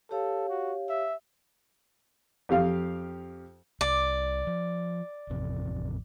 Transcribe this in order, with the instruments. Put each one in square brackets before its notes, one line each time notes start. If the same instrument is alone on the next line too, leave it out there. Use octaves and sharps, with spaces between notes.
[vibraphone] G4 C#5 F5 [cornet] A4
[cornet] F#4
E5
[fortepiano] F2 G4 F5
[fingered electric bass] C2 [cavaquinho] D5
[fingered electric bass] F3
A1 F2 C3